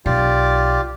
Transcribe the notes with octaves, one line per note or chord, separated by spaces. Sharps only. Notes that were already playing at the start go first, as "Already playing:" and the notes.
B1 F4 G4 D5